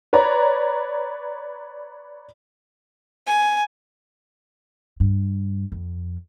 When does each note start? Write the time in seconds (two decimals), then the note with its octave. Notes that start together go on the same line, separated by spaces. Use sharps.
0.13 B4 C#5 D5 A#5
3.27 G#5
5.00 G2
5.72 F2